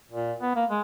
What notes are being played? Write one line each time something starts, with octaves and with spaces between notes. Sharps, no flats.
A#2
B3
A#3
G#3